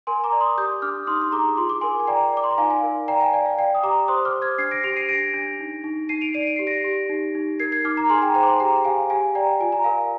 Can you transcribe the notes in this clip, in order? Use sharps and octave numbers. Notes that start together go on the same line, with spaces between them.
A#4 G#5 C6
A#5 D6
D5
C6 D#6
G4 D#6 G6
D4 D6 F6
D#4 C6 D#6
C6
G#4 A#5 D6
F4 C6
D6
A#4 G#5 C6
G#5
D5 G5 A#5
D5 D6
C6
A#5
D#4 F5 G#5
F5 G#5
A#4
D5 G5 A#5
F5 G#5
D5 G5
F5
D5 G5
D#6
G4 A#5 D6
C5 C6 D#6
D6 F6
C5
F6 G#6
D4 G#6 C7
A#6 D7
G4 D7 F7
C7 D#7
D4 A#6 D7
D4
D#4
D#4
D#4 C7 D#7
D7 F7
D5 C7 D#7
D7
G4 C7
A#6 D7
G4
D#4
D#4
A#4 G#6 C7
G#6 C7
D#4 D6 F6
A#5 D6
G#4 G#5 C6
G5 A#5
C5 G5 A#5
D6
G#5 C6
G4 G5 A#5
G4 F5 G#5
G4 F5 G#5
D5 G5 A#5
F4 G#5
A#5
A#4 F5 G#5